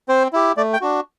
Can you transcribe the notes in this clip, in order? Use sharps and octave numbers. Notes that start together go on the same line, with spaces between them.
C4 C5
E4 G4
A3 D5
G5
D4 F#4